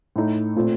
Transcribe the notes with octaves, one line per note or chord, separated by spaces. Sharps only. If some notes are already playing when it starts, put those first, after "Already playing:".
A2 A3 D#4
A#2 A3 C4 F4